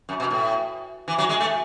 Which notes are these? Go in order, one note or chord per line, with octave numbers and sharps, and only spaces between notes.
F#2
B2
A2
E3
F#3
G#3
A3